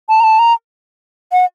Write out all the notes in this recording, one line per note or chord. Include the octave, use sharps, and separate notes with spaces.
A5
A#5
A5
A#5
F#5